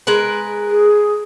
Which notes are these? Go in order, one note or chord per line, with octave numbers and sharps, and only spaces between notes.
G#3 A#4 B4
G#4